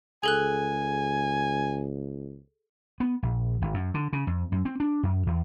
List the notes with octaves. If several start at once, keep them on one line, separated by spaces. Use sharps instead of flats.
C#2 G#4 A4 G#5 F#6
B3
A#1
G#1
F#2
D3
C#3
F2
F#2
C4
D4
F#2
E2